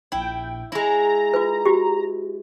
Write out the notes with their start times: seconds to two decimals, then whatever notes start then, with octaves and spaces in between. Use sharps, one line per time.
0.12 A#1 E4 G5
0.72 G#3 E4 A#5
1.34 F4 B4
1.65 F#4 G4